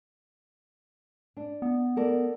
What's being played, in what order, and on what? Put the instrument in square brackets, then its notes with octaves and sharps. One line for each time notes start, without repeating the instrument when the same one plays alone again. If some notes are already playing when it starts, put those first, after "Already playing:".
[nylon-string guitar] D4
[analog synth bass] B3
[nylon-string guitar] A4 A#4 D5